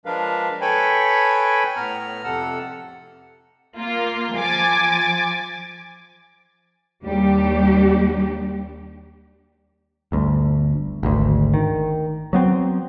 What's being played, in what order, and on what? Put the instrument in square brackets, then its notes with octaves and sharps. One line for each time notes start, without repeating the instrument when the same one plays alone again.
[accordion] F3 G#3 D4 A#4 B4 F5
A4 B4 C#5 G5 G#5 B5
A2 B3 A#5 F6
F2 C3 A4 F#5 E6
[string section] A#3 F4
F3 G#5 D6 A6
[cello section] D#2 G3 D4 G4
[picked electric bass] G1 D2
G#1 D2
D#3
F#3 B3 C4